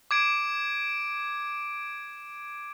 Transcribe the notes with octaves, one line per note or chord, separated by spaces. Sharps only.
D6 G#6 D7